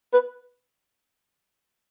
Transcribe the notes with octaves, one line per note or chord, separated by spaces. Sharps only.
B4